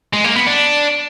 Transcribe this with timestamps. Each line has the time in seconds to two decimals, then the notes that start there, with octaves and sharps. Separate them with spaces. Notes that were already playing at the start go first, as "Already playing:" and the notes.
0.13 G#3
0.24 A#3
0.36 B3
0.47 D4